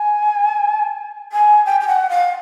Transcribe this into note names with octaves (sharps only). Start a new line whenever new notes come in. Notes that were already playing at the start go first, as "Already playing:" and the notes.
Already playing: G#5
G#5
G5
G5
F#5
F5